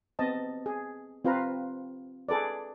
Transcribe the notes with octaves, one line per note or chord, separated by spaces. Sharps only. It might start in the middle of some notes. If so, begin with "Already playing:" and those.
B3 C4 D#5 A5
G#4
C4 F4 B4 F5 A#5
G#4 A4 B4 D5